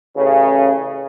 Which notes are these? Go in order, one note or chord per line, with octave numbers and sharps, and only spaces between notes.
A1 C#3